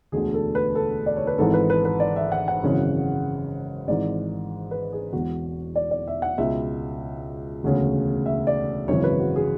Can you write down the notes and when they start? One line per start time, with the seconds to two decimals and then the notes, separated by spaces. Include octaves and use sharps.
0.12 E1 D2 D3 G#4
0.34 A4
0.55 B4
0.75 A4
1.06 D5
1.16 C#5
1.27 B4
1.38 G#1 G#2 E3 A4
1.54 B4
1.70 B4
1.85 B4
2.00 D5
2.16 E5
2.32 F#5
2.48 F#5
2.63 G#1 F#2 C#3 E3
3.88 G#1 G#2 E3 D5
4.71 B4
4.93 G#4
5.12 E1 E2 B2 F#4
5.76 D5
5.91 D5
6.07 E5
6.22 F#5
6.38 C#2 B2 E5
7.63 E1 D2 C#3
8.26 E5
8.47 D5
8.88 G#1 F#2 C#3 E3 C#5
9.04 B4
9.19 F#4
9.36 G#4